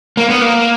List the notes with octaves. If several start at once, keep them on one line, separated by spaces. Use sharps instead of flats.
A#3
B3
A#3